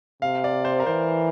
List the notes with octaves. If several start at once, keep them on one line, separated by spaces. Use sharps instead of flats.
C3 F5
D5
C5
A#4
E3 C5